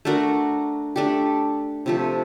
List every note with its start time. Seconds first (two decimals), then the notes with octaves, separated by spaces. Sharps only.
0.05 A3 D4 F#4 A#4
0.96 A3 D4 G4
1.86 C3 F3 A3